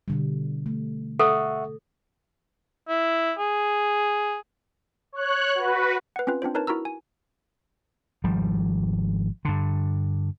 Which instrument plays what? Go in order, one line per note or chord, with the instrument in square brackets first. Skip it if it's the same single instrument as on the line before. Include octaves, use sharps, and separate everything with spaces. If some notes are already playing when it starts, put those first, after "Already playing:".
[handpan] B2 D3 G3
A3
[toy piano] A4 [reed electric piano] E5 F#5 C#6
[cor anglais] E4
G#4
[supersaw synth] C#5 F#6
F#4 B4
[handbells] B4 F#5
C4 C#4 F4 B4
C4 D4 F4 C5
D#4 A#4 B4 C#5 A5
E4 F#4 A#4 A#5 E6
G#5
[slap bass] G#1 F3 G3
G2 D3